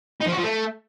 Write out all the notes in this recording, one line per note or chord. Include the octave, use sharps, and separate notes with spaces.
D#4
F3
F#4
F3
A3